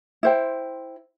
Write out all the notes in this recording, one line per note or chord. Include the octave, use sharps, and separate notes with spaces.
E4 C5 G5